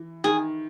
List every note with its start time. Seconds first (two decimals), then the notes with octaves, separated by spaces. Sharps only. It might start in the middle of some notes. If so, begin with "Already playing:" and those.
Already playing: E3
0.24 D#3 G#4